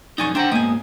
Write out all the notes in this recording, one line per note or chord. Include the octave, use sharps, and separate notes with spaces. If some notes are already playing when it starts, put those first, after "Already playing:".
B1 F2 D#4 D5 G#5 C#6
D4 C5 F#5 G5 A#5
G#2 A#3 B3 D#5 G#5